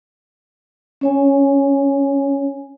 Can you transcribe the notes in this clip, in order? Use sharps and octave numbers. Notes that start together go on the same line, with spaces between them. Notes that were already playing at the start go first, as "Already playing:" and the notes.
C#4 C#5 G#5